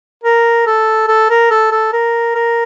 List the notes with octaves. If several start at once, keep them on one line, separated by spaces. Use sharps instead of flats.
A#4
A4
A4
A#4
A4
A4
A#4
A#4